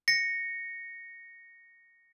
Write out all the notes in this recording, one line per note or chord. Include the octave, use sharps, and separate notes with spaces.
A#6 C#7